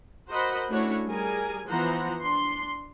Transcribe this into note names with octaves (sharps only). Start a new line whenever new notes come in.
F#4 A#4 C5 D#5 F#5 B5
A3 C#4 D4 E4 F#4 C#5
G3 G#4 A#4 G#5
E3 F3 B3 C5 F#5 A#5
D4 C6